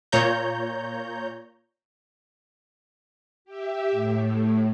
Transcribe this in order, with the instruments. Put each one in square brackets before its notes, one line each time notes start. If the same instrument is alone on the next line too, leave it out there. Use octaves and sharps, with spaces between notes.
[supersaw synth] A#2 C#5 A#5 G6
[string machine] G4 E5
A2